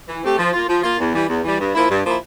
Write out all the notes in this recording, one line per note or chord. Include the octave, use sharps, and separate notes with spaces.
E3
A3 C4 G4
F3
A#3 F4
F3
A#3 F4
E2
E3 G3
E2
E3 G3
G2
F3 A#3 E4
G2
F3 A#3 E4